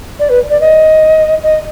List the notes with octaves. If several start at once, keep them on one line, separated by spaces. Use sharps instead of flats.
D5
B4
D5
D#5
D#5